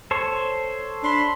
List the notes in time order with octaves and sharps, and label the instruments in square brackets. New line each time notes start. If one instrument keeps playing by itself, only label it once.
[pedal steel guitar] A4 C5 C#5
[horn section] D4 B5 C6